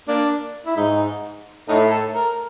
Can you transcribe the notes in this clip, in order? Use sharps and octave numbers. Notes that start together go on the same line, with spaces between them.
A#3 D4
E4
G#2 D#4
A2 D#4
A4
A#4